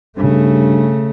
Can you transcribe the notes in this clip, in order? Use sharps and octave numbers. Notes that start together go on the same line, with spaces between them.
G2 C#3 A3